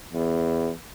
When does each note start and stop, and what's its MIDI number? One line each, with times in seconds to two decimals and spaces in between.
0.13 0.71 40